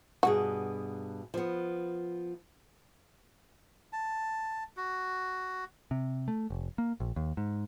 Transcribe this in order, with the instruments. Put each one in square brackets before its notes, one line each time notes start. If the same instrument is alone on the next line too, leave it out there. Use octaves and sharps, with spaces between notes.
[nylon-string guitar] G2 B2 G#4 [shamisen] F#4
[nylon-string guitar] F3 B3
[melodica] A5
F#4
[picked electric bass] C3
A3
F1
A#3
A#1
D#2
G#2